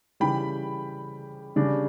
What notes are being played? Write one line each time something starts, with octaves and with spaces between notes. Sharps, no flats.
C#3 E3 G3 G5 B5
C#3 G3 D4